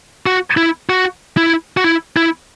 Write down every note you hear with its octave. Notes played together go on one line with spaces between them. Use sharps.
F#4
E4
F#4
E4
F#4
E4
E4